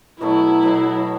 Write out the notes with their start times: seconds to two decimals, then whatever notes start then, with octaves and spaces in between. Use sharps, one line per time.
0.21 B2 F#3 A3 E4
0.62 B2 F#3 A3